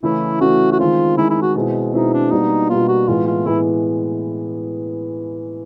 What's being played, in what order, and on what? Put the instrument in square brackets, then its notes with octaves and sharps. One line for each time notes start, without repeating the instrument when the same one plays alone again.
[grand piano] C#3 E3 A3 C#4 [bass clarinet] E4
[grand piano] C#3 E3 A3 C#4 [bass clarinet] F#4
[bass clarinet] F#4
[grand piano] D#3 G#3 C4 [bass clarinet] F4
[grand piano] D#3 G#3 C4 [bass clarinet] E4
[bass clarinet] E4
F#4
[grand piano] B2 G#3 C4 E4
[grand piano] B2 G#3 C4 E4 [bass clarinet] D#4
[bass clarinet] D4
[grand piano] B2 G3 A#3 D4 [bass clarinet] D#4
[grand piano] B2 G3 A#3 D4 [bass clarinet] F4
[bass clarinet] F#4
[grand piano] A2 E3 G#3 B3 [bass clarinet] F4
[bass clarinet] F4
[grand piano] A2 E3 G#3 B3 [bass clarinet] E4